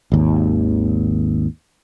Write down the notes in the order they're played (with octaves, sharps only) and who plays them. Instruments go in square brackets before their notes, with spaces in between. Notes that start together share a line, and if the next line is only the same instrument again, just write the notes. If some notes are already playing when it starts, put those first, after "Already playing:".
[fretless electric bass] G#1 D#2